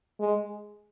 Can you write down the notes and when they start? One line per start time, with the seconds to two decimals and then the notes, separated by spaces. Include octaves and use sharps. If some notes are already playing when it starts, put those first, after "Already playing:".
0.20 G#3